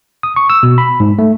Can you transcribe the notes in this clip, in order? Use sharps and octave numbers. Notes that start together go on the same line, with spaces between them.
D#6
C#6
E6
B2
B5
G#2
A3